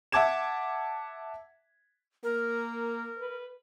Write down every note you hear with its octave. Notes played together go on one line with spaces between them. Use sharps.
E5 F#5 A5 D6 G#6 E7
A#3 A#4
B4